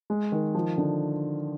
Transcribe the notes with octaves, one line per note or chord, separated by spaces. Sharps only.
G#3
D#3
F3
D3